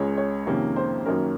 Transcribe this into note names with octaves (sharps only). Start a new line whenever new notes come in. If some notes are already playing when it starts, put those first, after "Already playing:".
Already playing: C#2 C#3 G#3 C#5
C#5
F2 C3 D#3 A#3 C#4
C5
F#2 D#3 A#3 C#4 A#4